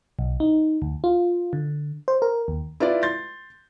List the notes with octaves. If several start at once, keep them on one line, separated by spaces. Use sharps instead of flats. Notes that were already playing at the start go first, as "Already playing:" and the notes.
B1
D#4
D2
F4
D3
C5
A#4
D#2
E4 F4 B4 D5
C6 G6 A6